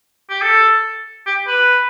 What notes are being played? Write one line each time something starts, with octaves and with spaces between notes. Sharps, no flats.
G4
A4
G4
B4